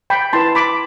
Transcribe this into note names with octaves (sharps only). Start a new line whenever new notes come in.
G5 B5
E4 B4 A5 C6
B5 D6